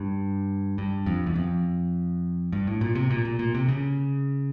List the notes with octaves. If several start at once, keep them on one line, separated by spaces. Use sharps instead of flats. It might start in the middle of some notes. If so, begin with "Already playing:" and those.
Already playing: G2
G2
F2
E2
F2
G2
A2
A#2
C3
A#2
A#2
A#2
C3
C#3